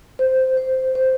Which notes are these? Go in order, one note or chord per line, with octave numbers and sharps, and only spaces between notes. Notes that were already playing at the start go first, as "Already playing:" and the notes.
C5
C5
C5